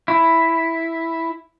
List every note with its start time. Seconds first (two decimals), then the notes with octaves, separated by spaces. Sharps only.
0.08 E4